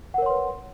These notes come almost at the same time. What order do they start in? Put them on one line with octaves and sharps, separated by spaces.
F#5 A#4 C#5 C6 B4